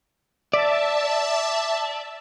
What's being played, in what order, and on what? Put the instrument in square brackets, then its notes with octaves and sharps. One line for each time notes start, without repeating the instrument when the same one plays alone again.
[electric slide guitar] D5 [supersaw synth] E5 A5